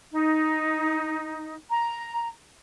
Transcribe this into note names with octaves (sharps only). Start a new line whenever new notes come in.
D#4
A#5